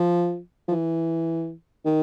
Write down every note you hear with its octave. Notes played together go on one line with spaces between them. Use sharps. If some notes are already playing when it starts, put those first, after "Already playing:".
Already playing: F3
F3
E3
D#3